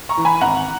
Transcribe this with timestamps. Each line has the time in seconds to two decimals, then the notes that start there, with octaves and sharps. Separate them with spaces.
0.09 A#5 C#6
0.17 E3
0.25 G#5 B5
0.41 G#1 F#5 A#5